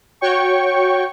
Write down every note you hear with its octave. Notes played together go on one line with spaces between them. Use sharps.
F#4 C#5 G5 C#6